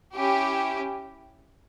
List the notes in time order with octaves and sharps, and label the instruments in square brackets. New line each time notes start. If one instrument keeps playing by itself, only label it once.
[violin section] C#4 E4 G4